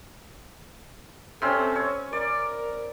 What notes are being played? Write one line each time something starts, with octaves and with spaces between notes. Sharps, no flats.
C3 C4 C#4 A4
C#5
A#4 D5